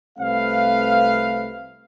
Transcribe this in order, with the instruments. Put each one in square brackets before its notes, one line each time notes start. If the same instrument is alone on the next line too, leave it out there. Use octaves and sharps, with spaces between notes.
[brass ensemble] C2 A3 C4 B4 F5